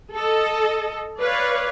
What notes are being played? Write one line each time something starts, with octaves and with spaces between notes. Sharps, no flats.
A4 D#5
B4 C#5 D5 F5